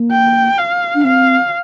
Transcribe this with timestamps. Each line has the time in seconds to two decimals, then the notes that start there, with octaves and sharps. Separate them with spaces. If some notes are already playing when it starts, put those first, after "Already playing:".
Already playing: A#3
0.12 G5
0.58 F5
0.95 D4
1.04 C4 F5